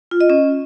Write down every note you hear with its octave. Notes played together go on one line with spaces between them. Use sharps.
F4
D#5
C#4